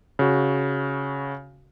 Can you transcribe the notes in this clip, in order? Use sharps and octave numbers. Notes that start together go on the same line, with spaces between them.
C#3 F#4